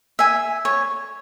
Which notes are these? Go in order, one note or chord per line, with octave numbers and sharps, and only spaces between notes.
E5 G#5
C#5